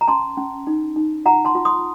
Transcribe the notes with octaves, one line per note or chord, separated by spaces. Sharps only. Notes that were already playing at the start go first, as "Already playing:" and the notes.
A#5
C#4 A5 C6
C#4
D#4
D#4
F4 F#5 A#5
A5 C6
F4
C6 D#6